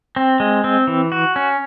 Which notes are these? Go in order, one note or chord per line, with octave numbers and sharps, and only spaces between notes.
C4
G#3
C4
E3
F#4
C#4